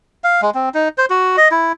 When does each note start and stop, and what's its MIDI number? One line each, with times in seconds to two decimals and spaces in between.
0.24 0.41 77
0.42 0.50 56
0.54 0.69 60
0.74 0.89 63
0.98 1.06 72
1.10 1.36 66
1.37 1.48 75
1.51 1.72 64